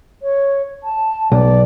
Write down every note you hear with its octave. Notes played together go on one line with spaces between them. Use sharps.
C#5
A5
B1 D5